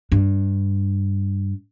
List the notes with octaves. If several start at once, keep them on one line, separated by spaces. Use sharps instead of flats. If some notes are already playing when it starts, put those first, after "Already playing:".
G2 D4